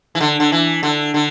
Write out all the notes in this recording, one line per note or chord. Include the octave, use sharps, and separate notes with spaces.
E3
D3
D3
E3
D3
D3